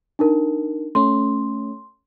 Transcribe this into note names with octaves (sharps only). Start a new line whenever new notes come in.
D4 D#4 A#4
A3 C#4 C6